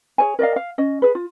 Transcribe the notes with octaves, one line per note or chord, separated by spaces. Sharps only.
G#4 C#5 G#5
A#4 D5 D#5 F5
F5
C#4 D#5
G#4 B4
F4